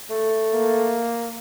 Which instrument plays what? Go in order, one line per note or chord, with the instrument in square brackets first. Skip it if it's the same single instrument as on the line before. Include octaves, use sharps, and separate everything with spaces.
[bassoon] A3
[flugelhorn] A#3